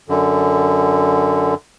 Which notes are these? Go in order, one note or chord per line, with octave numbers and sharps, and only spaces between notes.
F#2 D3